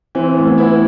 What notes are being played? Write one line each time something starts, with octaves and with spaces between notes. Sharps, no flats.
E3 C4
A2
B3
E4